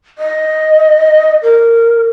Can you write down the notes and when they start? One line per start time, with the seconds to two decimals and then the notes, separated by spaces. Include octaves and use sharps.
0.18 D#5
1.43 A#4